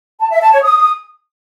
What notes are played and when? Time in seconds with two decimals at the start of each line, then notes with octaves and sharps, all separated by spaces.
0.20 A5
0.31 E5
0.41 A5
0.52 C#5
0.62 D#6